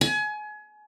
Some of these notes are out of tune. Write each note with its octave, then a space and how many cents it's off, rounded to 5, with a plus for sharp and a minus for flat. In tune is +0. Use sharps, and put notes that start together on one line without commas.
G#5 +30